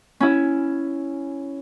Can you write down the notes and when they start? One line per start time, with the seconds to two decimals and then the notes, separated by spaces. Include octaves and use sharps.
0.20 C#4 E4